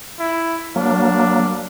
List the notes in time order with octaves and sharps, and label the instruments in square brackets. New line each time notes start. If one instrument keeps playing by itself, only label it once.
[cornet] E4
[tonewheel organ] F#3 A#3 [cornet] D4